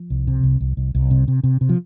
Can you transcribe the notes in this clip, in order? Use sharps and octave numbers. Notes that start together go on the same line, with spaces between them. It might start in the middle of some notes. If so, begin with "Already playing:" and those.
Already playing: F3
C2
C3
C2
C2
C2
C2
C3
C3
C3
C3
F3